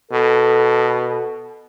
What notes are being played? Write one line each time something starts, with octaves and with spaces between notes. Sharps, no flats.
B2 A4